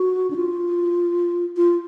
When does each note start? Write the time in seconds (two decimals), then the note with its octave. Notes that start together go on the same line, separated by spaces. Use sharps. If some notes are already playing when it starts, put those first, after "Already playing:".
Already playing: F#4
0.31 D4
0.36 F4
1.57 F4